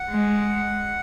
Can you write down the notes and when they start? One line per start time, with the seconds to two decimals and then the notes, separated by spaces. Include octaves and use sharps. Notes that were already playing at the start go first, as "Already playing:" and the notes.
Already playing: F#5
0.11 G#3